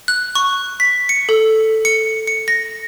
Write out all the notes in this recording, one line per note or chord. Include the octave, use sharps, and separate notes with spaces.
F#6
C#6
B6
C#7
A4
C#7
C#7
A#6